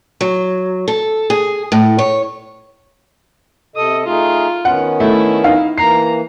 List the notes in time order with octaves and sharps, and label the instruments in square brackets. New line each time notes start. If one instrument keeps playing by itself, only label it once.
[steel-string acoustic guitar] F#3
A4
G#4
A2
C#5
[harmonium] C3 A4 D#5 [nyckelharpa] D#6
[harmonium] A3 D#4 G#4 [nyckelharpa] F4
[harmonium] D#3 B3 C#4 [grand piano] F#5
[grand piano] A3 [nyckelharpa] E4
[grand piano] D#4 F5
[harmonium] E3 A#3 [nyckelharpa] A#5 [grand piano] C7